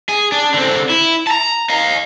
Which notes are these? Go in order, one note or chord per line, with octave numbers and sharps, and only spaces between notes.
G#4
D4
D3 C4
E4
A5 A#5
D#5 F5